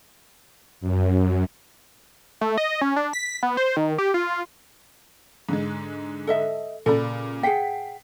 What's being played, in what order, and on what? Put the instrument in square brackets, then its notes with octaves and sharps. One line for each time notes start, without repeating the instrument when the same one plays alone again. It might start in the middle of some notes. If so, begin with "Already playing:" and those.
[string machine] F#2
[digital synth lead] A3
D#5
C#4
D4
B6
B3
C5
D#3
G4
F4
[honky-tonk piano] G#2 D3 G#3
[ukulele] A4 D#5 E5
[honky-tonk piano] A#2 C#3 [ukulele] A4 D5 B5
[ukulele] G#4 F#5 G5 [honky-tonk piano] B6 C7